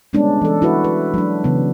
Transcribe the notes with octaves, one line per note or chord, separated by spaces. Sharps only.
G3 G#3 B3 C#4 D4
E3 A4
E4 F#4 B4
B4
F#3 G#3 D4
C#3 E3 B3